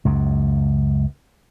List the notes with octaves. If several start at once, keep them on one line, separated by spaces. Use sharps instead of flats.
C#2 F#2